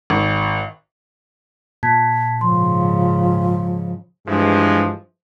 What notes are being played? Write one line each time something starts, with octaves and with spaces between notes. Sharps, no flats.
G#1
A#2 A5 G#6 B6
G#2 C#3 F3 C6
G2 E3 F3 G#3